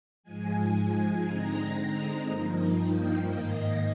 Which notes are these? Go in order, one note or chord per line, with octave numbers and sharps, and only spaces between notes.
G#2 F3 G#3 G#5
D3 G#3 C4 D#4 A#5
G2 F3 A#3 D#4
G5
G#2 D#3 A#3 D#5